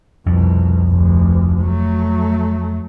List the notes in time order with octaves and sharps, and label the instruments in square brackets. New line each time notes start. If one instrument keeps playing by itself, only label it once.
[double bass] C2 B2 [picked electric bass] F2
[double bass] F1 D2
F#3 A3